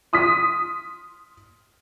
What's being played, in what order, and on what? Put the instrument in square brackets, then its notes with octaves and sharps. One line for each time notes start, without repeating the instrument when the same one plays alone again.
[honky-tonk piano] C6 D#6 F6 B6